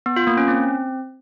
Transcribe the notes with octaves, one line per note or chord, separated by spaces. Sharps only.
B3
F4
A#3
C#4
C4